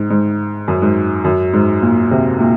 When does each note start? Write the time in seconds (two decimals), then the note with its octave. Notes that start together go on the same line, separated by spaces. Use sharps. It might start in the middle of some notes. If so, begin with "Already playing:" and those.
Already playing: G#2
0.10 G#2
0.68 F#2
0.82 G#2
1.24 F#2
1.53 G#2
1.82 A#2
2.11 C3
2.40 A#2